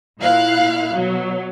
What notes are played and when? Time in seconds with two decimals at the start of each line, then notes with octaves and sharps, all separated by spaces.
0.20 A#2 E4 F5 F#6
0.94 B2 F#3